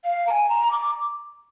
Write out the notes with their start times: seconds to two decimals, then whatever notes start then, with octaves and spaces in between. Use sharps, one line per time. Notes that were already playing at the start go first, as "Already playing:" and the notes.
0.04 F5
0.26 A#5
0.30 G#5
0.48 A#5
0.71 D6